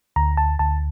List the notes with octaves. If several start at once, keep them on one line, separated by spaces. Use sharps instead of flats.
D2 A#5
A5
D2 A5